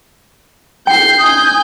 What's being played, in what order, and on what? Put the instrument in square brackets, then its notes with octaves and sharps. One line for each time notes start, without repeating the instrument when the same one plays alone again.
[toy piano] G5 [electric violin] G6 C7
[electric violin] G#5 G6 [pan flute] D#6